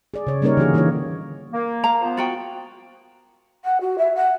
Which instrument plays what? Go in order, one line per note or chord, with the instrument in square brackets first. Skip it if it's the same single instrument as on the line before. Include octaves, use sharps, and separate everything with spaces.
[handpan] G#4 D5
C#3 C#5
G3 A#3 C#4 D#4 A#4 C#5
D3 E3 F#4 G#4
D3 E3 A#3 D#4 F4 C#5
[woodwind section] A#3
[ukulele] F5 A#5
[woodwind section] F3 B3 C5
[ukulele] F4 F#4 G5
[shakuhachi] F#5
F#4
E5
F#5